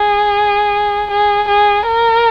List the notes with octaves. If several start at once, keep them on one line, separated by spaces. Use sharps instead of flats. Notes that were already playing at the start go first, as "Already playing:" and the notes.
Already playing: G#4
G#4
G#4
A#4